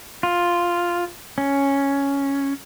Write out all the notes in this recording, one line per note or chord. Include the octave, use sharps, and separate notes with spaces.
F4
C#4